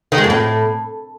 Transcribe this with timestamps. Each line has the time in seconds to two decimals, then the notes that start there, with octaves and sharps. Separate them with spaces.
0.12 D#3
0.18 G#3
0.24 F2
0.30 A2